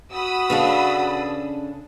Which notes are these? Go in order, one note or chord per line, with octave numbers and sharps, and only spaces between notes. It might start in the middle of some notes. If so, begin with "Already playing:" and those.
F#4 B5 D#6 E6
C#3 D4 A4 B4 F5 A5